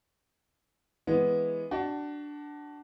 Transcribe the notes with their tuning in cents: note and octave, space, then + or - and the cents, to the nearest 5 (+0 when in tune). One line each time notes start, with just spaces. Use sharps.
E3 +0 G#3 +0 B3 +0
D4 +0 F#4 +25